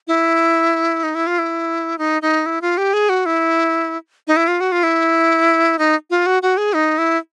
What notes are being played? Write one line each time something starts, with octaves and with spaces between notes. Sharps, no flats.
E4
D#4
E4
F4
E4
D#4
D#4
E4
F4
G4
G#4
F#4
E4
D#4
E4
F4
F#4
F4
E4
D#4
F4
F#4
F#4
G#4
D#4
E4